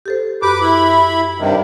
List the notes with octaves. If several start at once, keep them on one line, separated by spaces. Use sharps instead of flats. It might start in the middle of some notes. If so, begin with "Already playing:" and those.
G4 A4 C5
F#2 G4 B4 D6
E4 B5
G2 C3 D#3